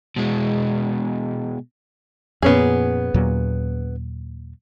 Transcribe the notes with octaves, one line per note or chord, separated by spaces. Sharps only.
B2 G#3
F2 A#2 B3 C#4 G#4
D#2 A#2 F#3